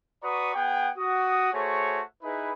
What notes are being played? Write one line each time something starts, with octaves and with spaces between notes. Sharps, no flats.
F#4 B4 D5 A#5 C#6 D#6
B3 G#4 F#5 G5
F#4 D#6
A3 F#4 G#4 C5 C#5
D#4 E4 G#4 B4